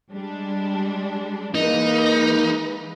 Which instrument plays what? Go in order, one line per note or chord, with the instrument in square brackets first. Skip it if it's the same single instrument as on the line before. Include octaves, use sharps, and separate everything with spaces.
[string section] G3 G#3 D4
[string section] E3 G#3 B4 [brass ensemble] A#3 [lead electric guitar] D#4